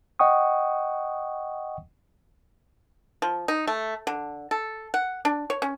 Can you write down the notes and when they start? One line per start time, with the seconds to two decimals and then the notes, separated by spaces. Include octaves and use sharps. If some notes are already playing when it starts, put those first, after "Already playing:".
0.19 D#5 F#5 G5 C#6 D#6
3.22 F3
3.48 D#4
3.68 A3
4.07 D3
4.51 A4
4.94 F#5
5.25 D4
5.50 C#5
5.62 C#4